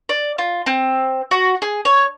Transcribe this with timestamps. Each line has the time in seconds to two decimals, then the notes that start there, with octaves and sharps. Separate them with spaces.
0.09 D5
0.38 F4
0.66 C4
1.31 F#4
1.62 G#4
1.85 C#5